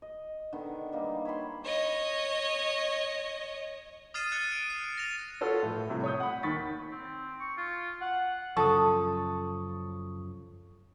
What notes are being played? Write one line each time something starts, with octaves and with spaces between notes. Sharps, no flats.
D#5
D3 D#3 B3
G3 A#3 D#4
C#5 E5 B5 C6
C#5 D#5
D#6 F6 A6 C7 D#7 E7
F#6 A6 C#7 D#7 E7
D7 D#7
C7
A#6 F7
F4 F#4 A4 B4 C#5
A2 F3
A2 C3 G3
C#5 D#6 G6
F#5 B5
D#2 D#3 B5 C#6 A6 B6
C4
C#6
F4
F#5
F#2 C#3 F3 A4 C#6 D#6